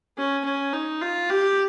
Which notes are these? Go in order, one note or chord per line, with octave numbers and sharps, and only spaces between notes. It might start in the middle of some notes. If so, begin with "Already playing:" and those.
C#4
C#4
D#4
F4
G4